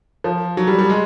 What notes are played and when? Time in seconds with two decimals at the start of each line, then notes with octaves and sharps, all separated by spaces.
0.24 F3
0.57 F#3
0.67 G3
0.78 G3
0.89 G#3